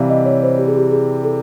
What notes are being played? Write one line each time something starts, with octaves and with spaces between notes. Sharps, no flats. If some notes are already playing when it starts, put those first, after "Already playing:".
Already playing: C3 E3 G3 E5 F5
D#5
C#5
C5
G4
G#4
G4
G#4
A4